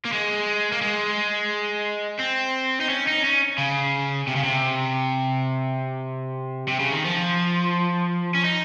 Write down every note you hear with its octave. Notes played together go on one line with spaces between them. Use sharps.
A#3
G#3
A#3
G#3
C4
D#4
C#4
D#4
C#4
C#3
C3
C#3
C3
C3
C#3
D#3
F3
C#4
D#4